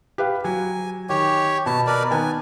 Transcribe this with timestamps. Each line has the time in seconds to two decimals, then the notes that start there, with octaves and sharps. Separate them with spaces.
0.18 G4 B4 F5
0.44 F#3 G#5
1.09 D#3 G4 C#5
1.66 B2 A5 B5
1.87 A#4 B4 D5
2.11 D#3 B3 G#5 A5